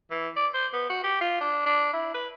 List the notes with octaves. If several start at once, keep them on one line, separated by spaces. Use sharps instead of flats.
E3
D5
C5
B3
F#4
G4
F4
D4
D4
E4
B4